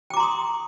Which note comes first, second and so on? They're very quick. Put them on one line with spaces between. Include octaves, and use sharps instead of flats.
G5 D6 A#5 C6 D#6